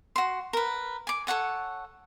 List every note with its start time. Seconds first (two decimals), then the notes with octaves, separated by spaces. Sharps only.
0.16 F#4 C6
0.53 A#4 B4
1.07 G#5 D6
1.27 A4 C#5 F#5 G#5